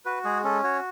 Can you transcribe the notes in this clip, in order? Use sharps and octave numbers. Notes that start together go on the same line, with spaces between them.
F#4 B4
G#3 G#4
C#4 A4
F#4 C#5